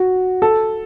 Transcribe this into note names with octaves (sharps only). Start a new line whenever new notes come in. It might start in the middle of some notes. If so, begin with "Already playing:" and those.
Already playing: F#4
A4